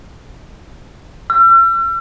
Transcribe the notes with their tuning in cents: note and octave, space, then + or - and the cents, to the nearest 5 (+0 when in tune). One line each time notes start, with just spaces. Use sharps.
E6 +45